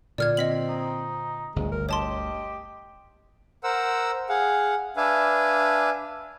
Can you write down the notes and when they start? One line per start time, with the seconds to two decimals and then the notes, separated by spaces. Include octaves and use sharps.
0.18 A#2 D3 D5 F6 G#6
0.37 C4 D#5 B6 F#7
0.69 D#4
1.56 G1 D2 G#3
1.72 A#4
1.89 G4 C#5 D#5 A5 C6
3.64 A#4 C5 F#5 E6
4.29 G#4 F5 F#5
4.97 D4 B4 E5 F5 G#5